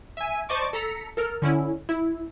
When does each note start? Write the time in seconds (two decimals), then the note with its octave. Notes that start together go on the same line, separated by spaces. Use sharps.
0.17 E5 G#5
0.49 C5 D5 D#5 A5 C#6 D6
0.73 A4 A#5 B6 C#7
1.17 A4 A#4 F6
1.42 D3 C#4 E4
1.89 E4